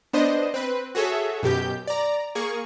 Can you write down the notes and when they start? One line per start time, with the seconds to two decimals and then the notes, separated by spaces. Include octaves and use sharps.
0.13 B3 D4 C5 D#5
0.54 C4 B4
0.95 F#4 G#4 A4 C#5 E5
1.43 F#2 B2 G4 G6
1.87 D5 A#5
2.35 A#3 G#4 C#6